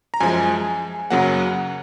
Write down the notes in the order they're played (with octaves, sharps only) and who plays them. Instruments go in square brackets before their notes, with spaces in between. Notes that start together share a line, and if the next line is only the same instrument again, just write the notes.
[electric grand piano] A#5
F#2 F3 G#3 G#5
F#2 C#3 F#3 A#3 F#5